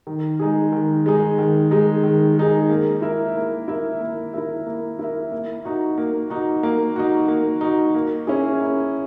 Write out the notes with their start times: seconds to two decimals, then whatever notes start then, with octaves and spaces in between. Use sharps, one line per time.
0.07 D#3
0.40 G#3 D#4 G#4
0.72 D#3
1.06 G#3 D#4 G#4
1.38 D#3
1.71 G#3 D#4 G#4
2.03 D#3
2.37 G#3 D#4 G#4
2.70 A#3
3.02 E4 A#4 E5
3.36 A#3
3.68 E4 A#4 E5
4.01 A#3
4.34 E4 A#4 E5
4.67 A#3
4.99 E4 A#4 E5
5.32 A#3
5.65 D#4 F#4
5.98 A#3
6.30 D#4 F#4
6.63 A#3
6.96 D#4 F#4
7.28 A#3
7.61 D#4 F#4
7.94 A#3
8.27 C#4 E4 G#4
8.60 A#3